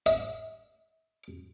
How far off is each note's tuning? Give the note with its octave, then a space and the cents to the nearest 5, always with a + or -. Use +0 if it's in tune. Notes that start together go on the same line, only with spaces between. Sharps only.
E5 -40